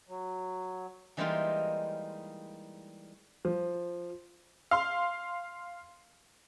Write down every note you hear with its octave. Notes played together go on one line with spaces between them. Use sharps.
F#3
E3 G3 G#3 A#3 D#4 F4
F3
F5 C6